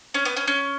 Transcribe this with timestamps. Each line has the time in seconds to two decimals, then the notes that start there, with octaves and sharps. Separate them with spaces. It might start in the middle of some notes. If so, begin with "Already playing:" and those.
0.14 C#4
0.25 B3
0.37 C#4
0.47 C#4